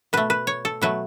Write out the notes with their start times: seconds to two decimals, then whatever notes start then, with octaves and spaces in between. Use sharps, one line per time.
0.13 B2 A3 B4
0.30 B4
0.47 C#5
0.65 A4
0.81 B2 F#3 A3 B4